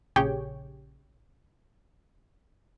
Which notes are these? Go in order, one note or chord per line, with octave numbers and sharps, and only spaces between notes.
A#1 C#3 G4 G#4 C#5 G5